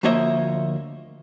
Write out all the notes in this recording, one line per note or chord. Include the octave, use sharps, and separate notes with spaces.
D2 F3 A#3 C#5 D#5 E5